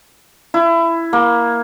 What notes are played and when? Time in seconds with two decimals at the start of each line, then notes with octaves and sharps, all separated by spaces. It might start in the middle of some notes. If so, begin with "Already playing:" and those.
0.54 E4
1.13 A#3